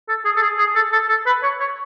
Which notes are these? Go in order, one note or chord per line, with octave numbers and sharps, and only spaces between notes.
A4
G#4
A4
G#4
G#4
A4
A4
A4
B4
C#5
C#5